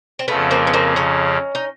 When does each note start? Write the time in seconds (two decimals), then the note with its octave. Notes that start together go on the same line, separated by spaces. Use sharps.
0.19 C4
0.28 F2 C#3 F3 A3 B3
0.51 A#3 C4
0.67 B3
0.73 A#3 C4
0.96 C#4 D#4
1.55 D#4